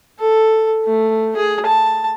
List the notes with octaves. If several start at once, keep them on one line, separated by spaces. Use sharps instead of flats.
A4
A3
G#4
A5